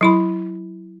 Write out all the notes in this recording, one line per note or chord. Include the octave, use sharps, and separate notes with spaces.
F#3 E4 B5